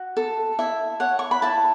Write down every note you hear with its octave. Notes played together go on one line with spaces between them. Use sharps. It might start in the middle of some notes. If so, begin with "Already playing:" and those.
Already playing: F#4
A4
E4 E5
C#5 F#5
C#6
B5
E4 A5